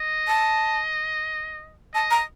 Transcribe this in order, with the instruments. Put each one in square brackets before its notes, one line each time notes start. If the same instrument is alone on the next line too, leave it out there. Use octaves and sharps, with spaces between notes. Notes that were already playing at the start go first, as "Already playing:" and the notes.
Already playing: [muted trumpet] D#5
[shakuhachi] A5
[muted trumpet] D#5 [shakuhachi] A5
[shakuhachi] A#5